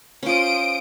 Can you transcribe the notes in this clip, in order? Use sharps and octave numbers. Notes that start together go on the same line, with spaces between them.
C#4 F4 C5 D#6 D7